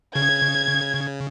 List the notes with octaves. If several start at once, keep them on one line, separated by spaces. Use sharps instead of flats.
C#3 G#6